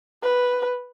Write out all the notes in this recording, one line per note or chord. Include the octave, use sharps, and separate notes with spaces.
B4